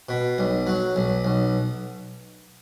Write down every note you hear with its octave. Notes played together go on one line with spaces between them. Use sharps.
B2
B1
F#3
B1
B1